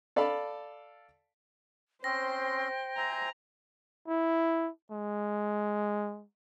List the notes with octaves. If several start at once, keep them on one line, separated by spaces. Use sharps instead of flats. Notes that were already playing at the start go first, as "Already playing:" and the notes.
A4 D5 F5 A5 B5
C4 C#4 C5 G5 C6 A#6
C5 E5 G#5 A#5
E4
G#3